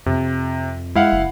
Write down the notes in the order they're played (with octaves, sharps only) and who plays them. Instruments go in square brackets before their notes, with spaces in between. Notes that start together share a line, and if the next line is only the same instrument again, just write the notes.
[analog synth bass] F2 [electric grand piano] C3
[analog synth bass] G#3 [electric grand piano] E4 F5 F#5
[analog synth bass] F#1